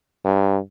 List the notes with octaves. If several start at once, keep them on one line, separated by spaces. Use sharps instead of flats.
G2